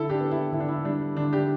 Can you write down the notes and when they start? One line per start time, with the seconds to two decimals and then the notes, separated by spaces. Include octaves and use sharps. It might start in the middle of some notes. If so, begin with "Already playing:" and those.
Already playing: D3 E4 A4
0.10 D4 G4
0.20 B3
0.31 E4
0.52 D3 E4
0.60 D4
0.68 E4
0.85 G3 D4
1.17 D3 D4
1.33 D4 G4